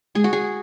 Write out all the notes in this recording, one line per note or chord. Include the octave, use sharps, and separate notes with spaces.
G#3 G#4
F#4
G#4